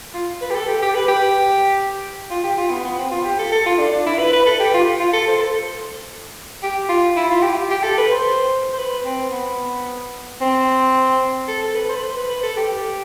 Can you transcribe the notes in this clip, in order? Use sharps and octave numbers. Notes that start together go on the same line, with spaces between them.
F4
B4
G4
A4
G4
G4
B4
G4
F4
G4
F4
B3
B3
C4
F4
G4
A4
A4
F4
D4
D4
E4
B4
B4
A4
G4
F4
F4
A4
C5
A4
G4
F4
E4
F4
G4
G4
A4
B4
C5
C5
B4
C4
B3
C4
A4
A4
B4
C5
B4
C5
B4
B4
A4
G4